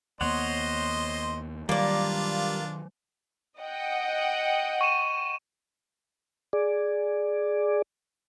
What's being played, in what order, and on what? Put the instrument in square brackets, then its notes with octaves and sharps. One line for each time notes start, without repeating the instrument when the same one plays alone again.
[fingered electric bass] D#2 A#3 B3 [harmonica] C5 D#5 C6 [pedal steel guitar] C#5 F#5
[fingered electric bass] D#3 F#3 [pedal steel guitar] G3 [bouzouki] A#3 D5 [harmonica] D4 F4
[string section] D#5 F#5 G5
[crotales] C#6 D#7 E7
[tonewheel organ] G#4 D5